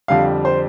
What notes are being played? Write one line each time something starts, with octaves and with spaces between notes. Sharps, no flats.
F2 D3 G3 F5
C5